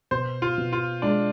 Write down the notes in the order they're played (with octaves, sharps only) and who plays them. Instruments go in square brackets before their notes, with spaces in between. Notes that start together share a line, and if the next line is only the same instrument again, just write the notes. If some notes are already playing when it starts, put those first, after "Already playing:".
[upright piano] B2 [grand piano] C5
[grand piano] F4
[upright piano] B2
[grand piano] F4
[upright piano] G#3 [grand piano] D4